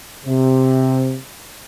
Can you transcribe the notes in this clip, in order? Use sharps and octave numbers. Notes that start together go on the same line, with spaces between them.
C3